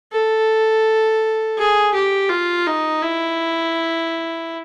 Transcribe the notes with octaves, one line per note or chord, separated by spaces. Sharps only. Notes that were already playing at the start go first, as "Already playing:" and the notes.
A4
G#4
G4
F4
D#4
E4